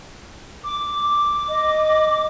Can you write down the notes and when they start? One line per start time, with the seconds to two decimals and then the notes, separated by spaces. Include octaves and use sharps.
0.63 D6
1.49 D#5